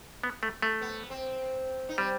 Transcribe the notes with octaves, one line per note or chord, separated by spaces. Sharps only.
B3
A3
A3
B3
C4
D#4
G3 C4